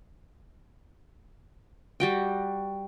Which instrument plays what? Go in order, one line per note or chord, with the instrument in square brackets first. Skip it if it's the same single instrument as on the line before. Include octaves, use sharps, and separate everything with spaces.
[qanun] G3 F#4 G5